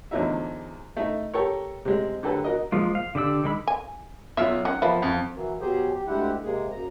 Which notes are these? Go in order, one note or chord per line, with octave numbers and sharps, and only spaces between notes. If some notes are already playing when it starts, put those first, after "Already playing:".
E2 D3 F3 F#3 D#4 E5
A3 D#4
G4 A4 A#4 C#5
C3 G#3
D3 F#3 F#4 G4 A4 B4
F#4 A#4 D#5
F3 G#3 A#3 F4
F5
D3 G4 D5 E6
D#3 G#3 B5 E6
G#5
B1 F4 E5 E6
D#3 C#4 F#5
F3 A#3 B3 E4
F2
E3 F#3 A#3
B2 F#3 G4 G#4 C5
G4
D2 D3 G#3 E4 G4 F#5
C3 G#3 A#3 G#4
F#2 A#5